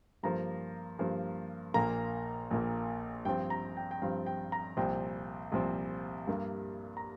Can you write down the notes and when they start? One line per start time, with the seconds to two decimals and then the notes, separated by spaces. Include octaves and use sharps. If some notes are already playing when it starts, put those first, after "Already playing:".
0.23 G2 F3 A#3 A#5
0.99 G2 F3 A#3
1.74 A#1 A#2 A#3 A#5
2.51 A#1 A#2 A#3
3.25 G2 F3 C4 G5
3.50 A#5
3.77 G5
3.91 G5
4.02 G2 F3 C4 F5
4.26 G5
4.52 A#5
4.77 C2 A#2 F3 C4 G5
5.52 C2 A#2 F3 C4
6.27 G2 G3 A#3
6.97 A#5